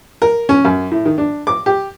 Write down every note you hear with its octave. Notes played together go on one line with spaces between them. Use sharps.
A#4
C#4
F#2
A2
D#3
D4
D6
G4